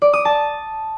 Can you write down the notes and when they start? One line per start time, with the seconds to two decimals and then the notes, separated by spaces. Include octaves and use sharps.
0.02 D5
0.13 D#6
0.25 A5